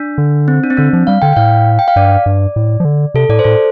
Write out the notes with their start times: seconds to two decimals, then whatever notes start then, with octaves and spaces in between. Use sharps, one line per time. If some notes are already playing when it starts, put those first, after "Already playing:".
Already playing: D4
0.18 D3
0.48 C4
0.64 D4
0.70 C4
0.77 D3 D4
0.93 F3
1.07 G3 F5
1.22 D3 G5
1.33 G5
1.36 A2 F5
1.79 G5
1.88 F5
1.96 G2 D5
2.26 G2
2.56 A2
2.80 F3
2.85 D3
3.14 C3 A4
3.29 A2 D5
3.39 C5
3.44 A2 A4